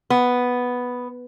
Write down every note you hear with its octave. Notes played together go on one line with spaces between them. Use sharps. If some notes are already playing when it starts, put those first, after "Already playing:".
B3